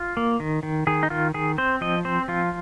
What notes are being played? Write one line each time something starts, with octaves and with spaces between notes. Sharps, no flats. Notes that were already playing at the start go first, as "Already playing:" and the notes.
Already playing: F4
A#3
D#3
D#3
D#3 G#4
D#4
D#3 F4
D#3 G#4
C4 C5
F3 D#5
C4 C5
F3 F4